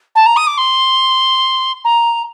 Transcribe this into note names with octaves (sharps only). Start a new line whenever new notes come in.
A5
A#5
D#6
D6
C6
A#5